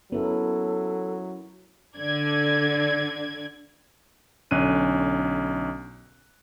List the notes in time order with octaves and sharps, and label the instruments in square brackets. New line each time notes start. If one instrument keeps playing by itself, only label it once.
[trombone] F#3 [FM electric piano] B3 [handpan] C#4 E4 A#4 [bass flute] A4
[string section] D3 D5 G#6
[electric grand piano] B1 D3 C#4 F#6 D#7